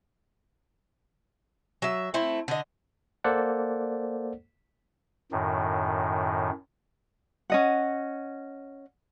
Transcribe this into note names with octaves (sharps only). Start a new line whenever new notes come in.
F#3 E5
A3 C4 E4
D3 D#5
A#3 A4 C5 D5 F#5
F#2 A2 D#3
C#4 D#5 F#5